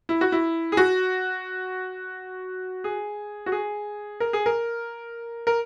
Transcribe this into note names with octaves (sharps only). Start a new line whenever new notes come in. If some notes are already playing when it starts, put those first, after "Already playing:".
E4
F#4
E4
G#4
F#4
G#4
F#4
G#4
A#4
G#4
A#4
A#4